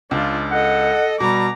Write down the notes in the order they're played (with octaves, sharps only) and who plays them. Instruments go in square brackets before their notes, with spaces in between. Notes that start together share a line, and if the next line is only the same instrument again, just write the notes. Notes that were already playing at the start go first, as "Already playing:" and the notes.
[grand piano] C#2 [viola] D4 F4
[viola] A4 D#5 [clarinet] F#5
[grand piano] B2 [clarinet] G3 [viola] A#5 D6